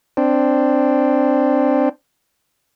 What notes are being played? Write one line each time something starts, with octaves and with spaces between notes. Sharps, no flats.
C4 D4